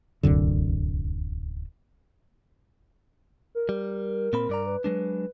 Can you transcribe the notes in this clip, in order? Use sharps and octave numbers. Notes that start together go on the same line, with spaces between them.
D1 C2 F#2 D3
A#4
G3
A#2 C4 B5
G2 D5 A#5
B4
F#3 G#3 D4 B4